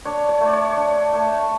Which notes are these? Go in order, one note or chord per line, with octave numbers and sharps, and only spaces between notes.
D4 C#5
C#5
A3
D5
C#5
D4
A3